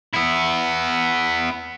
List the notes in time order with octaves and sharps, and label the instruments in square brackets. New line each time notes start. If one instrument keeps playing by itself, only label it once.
[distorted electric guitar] B3 E4